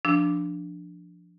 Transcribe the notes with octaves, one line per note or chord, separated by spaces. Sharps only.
F3 D4 E6